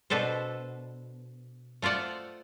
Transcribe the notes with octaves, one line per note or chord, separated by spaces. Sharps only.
B2 D4 A4 B4 C5
A3 F4 C5 D5 F#5